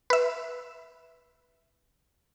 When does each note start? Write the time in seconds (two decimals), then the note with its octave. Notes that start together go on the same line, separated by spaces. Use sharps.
0.10 B4 E5